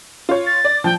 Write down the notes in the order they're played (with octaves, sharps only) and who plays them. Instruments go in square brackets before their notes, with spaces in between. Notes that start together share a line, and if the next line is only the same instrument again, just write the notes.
[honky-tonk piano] F4 C#5
[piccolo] A6
[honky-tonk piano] D5
[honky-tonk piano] F3 [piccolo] G5